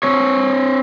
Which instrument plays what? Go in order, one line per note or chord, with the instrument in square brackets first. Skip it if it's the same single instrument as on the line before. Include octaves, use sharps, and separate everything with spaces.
[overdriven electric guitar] C4 C#5